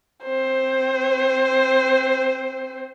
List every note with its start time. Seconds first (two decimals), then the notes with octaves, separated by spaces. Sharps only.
0.24 C4 C5